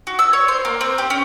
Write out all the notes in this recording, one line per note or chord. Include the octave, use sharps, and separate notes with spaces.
F#4
E6
C#5
C5
A#3
C4
G4
C#4